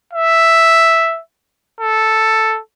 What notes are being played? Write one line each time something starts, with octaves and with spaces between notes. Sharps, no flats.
E5
A4